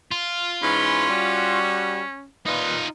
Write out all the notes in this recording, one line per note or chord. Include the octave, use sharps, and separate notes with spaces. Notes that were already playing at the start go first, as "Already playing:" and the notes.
F4
G#2 E3 C#4 B5
G3 F#4
A#2 D#4 F4 B4